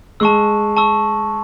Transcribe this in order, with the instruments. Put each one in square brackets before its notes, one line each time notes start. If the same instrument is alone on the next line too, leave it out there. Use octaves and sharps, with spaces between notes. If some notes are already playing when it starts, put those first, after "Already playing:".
[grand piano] G#3 [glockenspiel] A5 C#6 E6
[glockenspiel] A5 C#6 E6